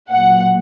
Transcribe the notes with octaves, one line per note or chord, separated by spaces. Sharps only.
A#2 F#3 F#5